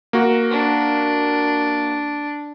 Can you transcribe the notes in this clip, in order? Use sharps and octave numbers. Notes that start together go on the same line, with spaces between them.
A#3 F#4
D4